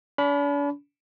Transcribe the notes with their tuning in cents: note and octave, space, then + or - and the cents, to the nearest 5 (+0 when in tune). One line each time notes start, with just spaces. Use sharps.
D4 -45 B5 +0